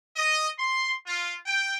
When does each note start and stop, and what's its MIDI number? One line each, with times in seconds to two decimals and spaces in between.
0.16 0.46 75
0.57 0.92 84
1.07 1.34 65
1.46 1.78 79